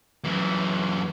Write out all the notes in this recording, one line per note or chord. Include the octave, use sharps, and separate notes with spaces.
F#2 E3